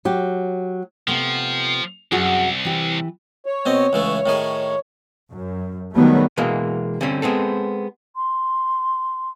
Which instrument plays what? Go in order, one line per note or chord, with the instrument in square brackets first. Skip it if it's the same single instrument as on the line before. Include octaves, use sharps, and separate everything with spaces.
[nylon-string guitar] F#3 G4
[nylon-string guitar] C3 A3 B3 [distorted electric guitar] F3
[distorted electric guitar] C2 [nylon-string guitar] F#2 F#4 G#4
[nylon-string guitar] E3 G4
[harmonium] C#5
[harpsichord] B2 C4 D#5
C#2 E3 A3
A2 D#3 G#4
[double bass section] F#2
D#3 F#3 G3 A3 B3
[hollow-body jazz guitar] B2 E3 G#3 A#3
D3 G3 C4 C#4
G#3 B3 C4 A4
[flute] C6